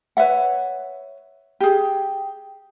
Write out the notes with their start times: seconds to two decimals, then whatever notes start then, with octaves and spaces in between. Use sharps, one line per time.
0.17 B4 C#5 E5 F#5
1.60 G4 G#4